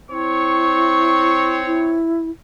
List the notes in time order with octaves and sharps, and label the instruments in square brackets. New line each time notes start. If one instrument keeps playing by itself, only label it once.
[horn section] C4 C#5 [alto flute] E4 [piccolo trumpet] C#6
[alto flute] E4